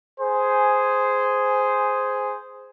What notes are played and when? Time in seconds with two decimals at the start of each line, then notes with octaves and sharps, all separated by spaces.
0.20 G#4 C5 G#5